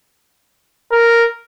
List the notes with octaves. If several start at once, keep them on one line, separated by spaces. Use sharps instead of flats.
A#4